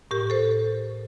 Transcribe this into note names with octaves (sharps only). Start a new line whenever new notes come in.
A2 G4 A#4
A4 C5